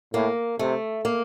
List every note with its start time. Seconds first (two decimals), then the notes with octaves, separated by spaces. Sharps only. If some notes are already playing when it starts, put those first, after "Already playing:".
0.14 A2 A#3
0.59 C3 A3
1.05 A#3